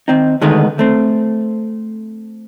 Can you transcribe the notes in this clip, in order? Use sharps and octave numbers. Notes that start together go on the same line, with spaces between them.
D#3 C4 D#4
D3 D#3 G#3 A3 B3 D#4
A3 C4